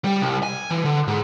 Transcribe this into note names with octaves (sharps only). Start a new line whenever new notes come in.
G3
C2
G#5
E3
D3
G#2